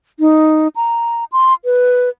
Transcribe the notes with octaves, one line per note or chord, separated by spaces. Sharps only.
D#4
A#5
C6
B4